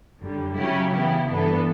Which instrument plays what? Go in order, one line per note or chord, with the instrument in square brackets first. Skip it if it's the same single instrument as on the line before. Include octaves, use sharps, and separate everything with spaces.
[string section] F#2 D3 G3
C#3 F#3 C#4 E4 G4
C#3 E3 B3 E4 G4
G2 E3 B3 D4 A4